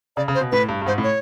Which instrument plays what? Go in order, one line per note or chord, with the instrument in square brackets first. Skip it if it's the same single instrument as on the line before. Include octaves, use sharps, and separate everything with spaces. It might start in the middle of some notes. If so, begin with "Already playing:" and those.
[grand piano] C#3 [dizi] D5
[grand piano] C#3
[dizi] C5
[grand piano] B2
[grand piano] A2 [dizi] B4
[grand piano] G2
G2
[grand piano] G#2 [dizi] C5
[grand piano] A2
[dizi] C#5